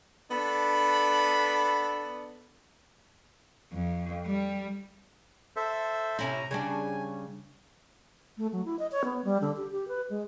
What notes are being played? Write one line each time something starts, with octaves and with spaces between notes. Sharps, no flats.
B3 D4 A4 B5
F2
G3
A4 C5 E5
C3 C#4 E4 A#5
C#3 G3 D4 G#5
A3
F#3
E4
D#5
C#5
B3
G3
D3
G4
G4
B4
G#3